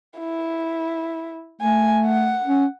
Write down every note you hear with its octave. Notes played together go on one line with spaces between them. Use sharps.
E4
A3 G#5
F#5
C#4